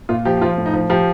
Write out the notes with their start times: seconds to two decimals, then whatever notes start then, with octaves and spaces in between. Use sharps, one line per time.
0.09 A#2 F4
0.25 F3 G4
0.37 G4
0.42 F3 F4
0.58 A2
0.66 D#4
0.74 F3
0.89 F3 G4